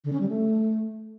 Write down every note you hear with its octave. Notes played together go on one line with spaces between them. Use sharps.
D3
C#4
G3
A3